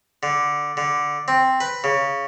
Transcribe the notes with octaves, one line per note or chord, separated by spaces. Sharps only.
D3
D3
C4
B4
C#3